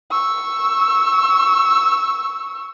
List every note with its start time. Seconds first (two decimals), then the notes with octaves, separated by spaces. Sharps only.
0.11 C#6 E6